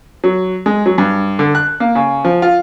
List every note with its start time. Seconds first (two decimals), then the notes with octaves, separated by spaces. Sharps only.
0.24 F#3
0.66 G#3
0.86 F#3
0.98 G2
1.39 D3
1.55 F#6
1.80 A#3
1.95 C#3
2.25 F3
2.42 F4